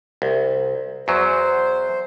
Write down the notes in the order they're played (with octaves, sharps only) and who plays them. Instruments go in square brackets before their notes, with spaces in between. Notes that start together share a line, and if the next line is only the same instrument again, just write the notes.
[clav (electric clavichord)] C2
[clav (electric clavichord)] E2 F#3 [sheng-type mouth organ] C5